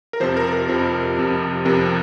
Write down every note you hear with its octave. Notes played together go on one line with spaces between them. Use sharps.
A#4
F2 C3 F3 C5
A#4
A#4
F2 C3 F3
F2 C3 F3
F2 C3 F3 A#4